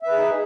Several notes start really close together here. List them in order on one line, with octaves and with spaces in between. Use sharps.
E5 B4 G#4 D#4